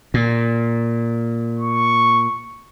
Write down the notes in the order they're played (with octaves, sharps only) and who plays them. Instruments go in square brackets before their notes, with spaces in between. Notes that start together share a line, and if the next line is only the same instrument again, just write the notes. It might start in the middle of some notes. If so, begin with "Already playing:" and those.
[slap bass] A#2
[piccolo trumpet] C#6